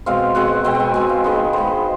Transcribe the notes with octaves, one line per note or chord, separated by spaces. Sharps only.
B2 G#3 C4 F5
B2 G#3 C4 F#5
B2 G#3 C4 G5
G5
G#5
B2 G#3 C4 G#5
F5
D#3 G#3 B3 D#5
D#3 G#3 B3 C5